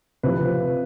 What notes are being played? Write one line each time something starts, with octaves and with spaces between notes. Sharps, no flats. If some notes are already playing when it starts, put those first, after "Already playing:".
C3 F3 B4